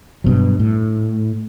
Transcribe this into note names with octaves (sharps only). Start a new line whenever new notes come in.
G2 B2 F#3
A2